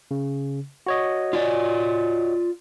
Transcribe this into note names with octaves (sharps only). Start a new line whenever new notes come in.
C#3
F#4 C#5 D#5
F4 D5